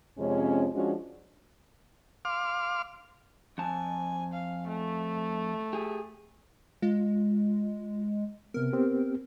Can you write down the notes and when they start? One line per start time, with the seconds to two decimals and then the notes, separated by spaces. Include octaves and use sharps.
0.19 F2 C3 G#3 C#4
0.73 F3 G#3 C#4 D4 F#4
2.25 F5 C6 D6 F6
3.58 F2 G#5 A5
4.33 F5
4.67 A3
5.73 G4 G#4
6.82 G#3 F4
8.54 C3 B3 A#4
8.73 B3 C4 G4